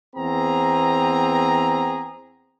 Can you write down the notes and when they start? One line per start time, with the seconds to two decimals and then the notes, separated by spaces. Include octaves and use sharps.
0.16 E2 B3 C4 G#4 A#5